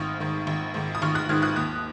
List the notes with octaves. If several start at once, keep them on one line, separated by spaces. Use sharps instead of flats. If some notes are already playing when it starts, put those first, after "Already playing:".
Already playing: G#1 G#2 D#3 C#6 D#6 F6
G#2 D#3
G#1
G#2 D#3
D#6
G#1 C#6 F6
D#6 F#6
G#2 D#3 F6 G#6
D#6 F#6
D#2 D#6 F#6